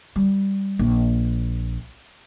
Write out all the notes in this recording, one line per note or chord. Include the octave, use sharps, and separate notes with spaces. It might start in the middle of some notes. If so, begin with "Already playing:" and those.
G3
A#1